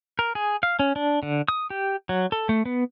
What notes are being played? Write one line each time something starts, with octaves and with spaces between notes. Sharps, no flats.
A#4
G#4
F5
C#4
D4
D3
D#6
G4
F#3
A4
A3
B3